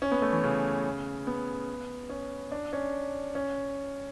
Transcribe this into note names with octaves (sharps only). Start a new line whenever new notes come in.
C#4
B3
A3
E3
C#3
B3
C#4
D4
C#4
C#4